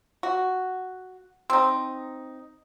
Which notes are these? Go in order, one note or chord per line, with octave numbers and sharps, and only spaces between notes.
F#4
C4 D#4